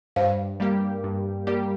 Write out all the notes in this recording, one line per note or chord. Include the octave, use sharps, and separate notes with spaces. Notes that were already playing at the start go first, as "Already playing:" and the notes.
G2 C5 F5
G3 A#3 G4
G2
G3 A#3 G4